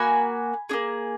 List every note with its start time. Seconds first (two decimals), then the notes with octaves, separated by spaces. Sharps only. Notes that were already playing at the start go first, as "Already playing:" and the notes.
Already playing: A#3 F#4 G#5 B5
0.69 A#3 D4 G#4